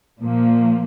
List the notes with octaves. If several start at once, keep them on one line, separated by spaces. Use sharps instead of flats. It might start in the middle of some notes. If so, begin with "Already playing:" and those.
A#2 F3 A#3